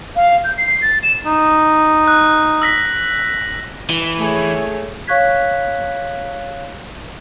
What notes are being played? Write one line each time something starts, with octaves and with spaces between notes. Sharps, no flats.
F5
G6
C7
A6
E7
D#4
F#6
E6 A#6 B6
E3
A3 G#4 C#5
C#5 F5 C#6 F#6 G#6 B6